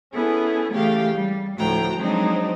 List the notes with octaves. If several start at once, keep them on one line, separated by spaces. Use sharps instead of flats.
B3 C#4 E4 G#4 A4
C#3 E3 A3 G4 F5
G3
D2 A2 F3 F#4 G5 A#5
F3 F#3 G#3 C4 D4 D#4